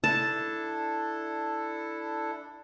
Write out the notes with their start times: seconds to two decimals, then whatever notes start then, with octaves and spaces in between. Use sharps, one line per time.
0.04 D4 E4 A4 A5